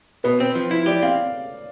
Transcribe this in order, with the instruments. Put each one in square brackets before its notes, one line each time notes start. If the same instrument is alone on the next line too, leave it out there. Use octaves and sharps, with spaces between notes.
[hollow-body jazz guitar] B2 [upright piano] B4
[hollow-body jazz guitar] C4 [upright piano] C5
[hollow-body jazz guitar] F3
E4
[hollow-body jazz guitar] G4 [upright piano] D5
[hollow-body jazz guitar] C4 [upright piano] F5